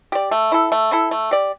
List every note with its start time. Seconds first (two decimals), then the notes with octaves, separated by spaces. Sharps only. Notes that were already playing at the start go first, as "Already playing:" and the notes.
0.12 G4 D5
0.31 A3
0.52 E4 A4
0.72 A3
0.92 E4 A4
1.11 A3
1.31 G4 D5